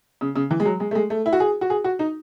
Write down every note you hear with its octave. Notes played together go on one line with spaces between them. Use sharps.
C#3
C#3
E3
G#3
F#3
G#3
A3
G#3
A3
E4
F#4
G#4
F#4
G#4
F#4
D#4